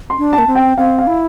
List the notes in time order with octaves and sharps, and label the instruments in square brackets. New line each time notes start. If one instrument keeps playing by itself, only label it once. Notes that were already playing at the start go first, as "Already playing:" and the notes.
[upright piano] C6
[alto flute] D4
[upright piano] A5
[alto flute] A#3
C4
[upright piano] G5
[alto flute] C4 [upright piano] F5
[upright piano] F5
[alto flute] E4